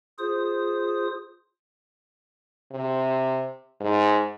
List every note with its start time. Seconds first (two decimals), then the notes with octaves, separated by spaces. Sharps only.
0.19 F4 G#4 C5 D#6
2.72 C3
3.81 G#2